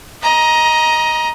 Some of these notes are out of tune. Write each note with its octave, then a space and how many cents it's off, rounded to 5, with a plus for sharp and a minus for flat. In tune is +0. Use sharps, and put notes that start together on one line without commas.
D#5 +5 A#5 +20